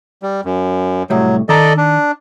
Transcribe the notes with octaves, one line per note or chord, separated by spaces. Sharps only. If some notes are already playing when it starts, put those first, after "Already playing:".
G3
F#2
C2 A2 F#3 G3
D#3 A4 D5 D#5 A#5
D4